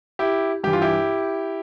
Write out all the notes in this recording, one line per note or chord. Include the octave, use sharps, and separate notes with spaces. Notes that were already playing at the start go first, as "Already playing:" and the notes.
E4 G4
G2 E3 G4
F4
E4 G4